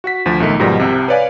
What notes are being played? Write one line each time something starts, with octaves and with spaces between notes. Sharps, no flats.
F#4 F#5 B6
D2 F3
B1 D#3 A3
G#2 B2 D#3 F3 G3 A#6
C2 C3
B4 C#5 D5 F5 G#5